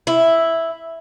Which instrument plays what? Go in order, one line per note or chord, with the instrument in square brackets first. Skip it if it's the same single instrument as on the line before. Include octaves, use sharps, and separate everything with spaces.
[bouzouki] E4